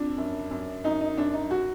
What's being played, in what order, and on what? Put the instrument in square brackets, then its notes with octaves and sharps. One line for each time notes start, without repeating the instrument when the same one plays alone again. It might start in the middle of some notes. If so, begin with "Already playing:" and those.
Already playing: [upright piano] F2 D4
F#2
F#2
F#2 D#4
D#4
F#2 D4
D#4
F#4